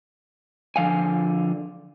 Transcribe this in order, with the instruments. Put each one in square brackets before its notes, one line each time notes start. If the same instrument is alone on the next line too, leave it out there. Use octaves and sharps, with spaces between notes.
[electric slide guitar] D3 F3 F5 G#5